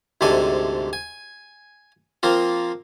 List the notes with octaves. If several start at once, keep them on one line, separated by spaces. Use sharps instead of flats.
D2 G#2 C3 A4 D5 G#5
G#5
F3 A#3 C4 F4